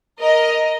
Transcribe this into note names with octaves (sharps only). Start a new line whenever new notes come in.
A#4 D#5